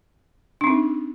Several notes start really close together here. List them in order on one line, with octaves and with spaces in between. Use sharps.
D4 C4 D#4